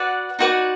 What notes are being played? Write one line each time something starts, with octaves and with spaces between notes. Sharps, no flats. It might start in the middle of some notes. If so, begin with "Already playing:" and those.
Already playing: F#4 B4 D5 F#5
D#4 F#4 B4 D5